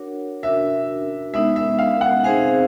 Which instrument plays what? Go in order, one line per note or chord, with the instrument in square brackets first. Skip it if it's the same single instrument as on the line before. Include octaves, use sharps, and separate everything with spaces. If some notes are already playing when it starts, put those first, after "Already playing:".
Already playing: [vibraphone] D4 F#4 A#4 C#5 F#5
[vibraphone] D4 F#4 A#4 [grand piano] E5
[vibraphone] G#3 B3 D#4 [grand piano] E5
[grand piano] E5
F5
F#5
[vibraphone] C4 D#4 G#4 C5 F5 [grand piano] G#5